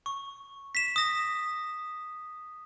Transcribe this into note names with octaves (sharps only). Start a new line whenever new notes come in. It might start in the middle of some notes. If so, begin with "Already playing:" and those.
C#6
B6 E7
D#6 A#6 E7